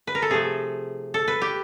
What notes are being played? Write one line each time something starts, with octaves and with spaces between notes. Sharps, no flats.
B4
A#4
A4
C3 F3 A3 G#4
A4
B4
G4